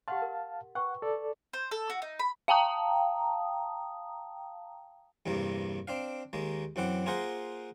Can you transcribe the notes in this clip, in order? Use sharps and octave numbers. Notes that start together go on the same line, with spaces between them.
G4 F5 F#5 A5 C6
A#4
B4 F#5 G5 C#6
A4 D5
C5
A4
F#4
D#4
B5
F5 G5 A5 A#5 D#6
E2 G2 C3 A#3
C4 D4 F5
D#2 G#3 A#3
F#2 E3 C4 F#5 D6
A#3 F4 G#4 A#4 C5 F#5